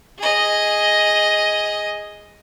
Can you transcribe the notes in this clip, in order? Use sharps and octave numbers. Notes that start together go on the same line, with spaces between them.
G#4 D#5